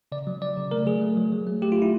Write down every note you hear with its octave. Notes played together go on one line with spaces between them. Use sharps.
C#3 D5
F#3
F#3 D5
C#3
A3 A#4
F#3 G#4
A3
F#3
F#3
A3
A3 G4
F4
A3 E4